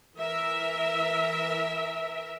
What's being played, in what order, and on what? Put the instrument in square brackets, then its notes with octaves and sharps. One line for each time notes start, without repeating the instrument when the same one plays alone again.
[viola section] E3 A#4 E5